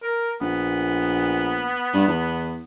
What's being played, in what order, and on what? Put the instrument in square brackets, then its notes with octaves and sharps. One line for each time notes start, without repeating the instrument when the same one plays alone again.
[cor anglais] A#4
[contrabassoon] A#1 [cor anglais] B3
[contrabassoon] G2
E2